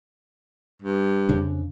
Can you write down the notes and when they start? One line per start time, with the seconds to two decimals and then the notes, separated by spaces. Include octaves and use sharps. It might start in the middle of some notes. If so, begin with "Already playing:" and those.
0.82 G2
1.29 F2 C#3 D4